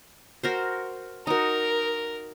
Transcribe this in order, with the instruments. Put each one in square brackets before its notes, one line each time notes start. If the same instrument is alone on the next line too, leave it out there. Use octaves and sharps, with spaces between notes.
[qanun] F#4 A#4 C5
[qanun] D#4 F#4 [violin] A#4